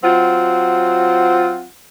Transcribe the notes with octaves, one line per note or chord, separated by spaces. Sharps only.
F#3 C4 F4 F#5